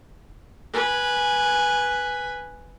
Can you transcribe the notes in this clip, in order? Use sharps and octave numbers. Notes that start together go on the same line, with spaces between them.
B4 G#5